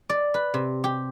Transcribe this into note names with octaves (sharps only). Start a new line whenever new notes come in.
D5
B4
C3
G4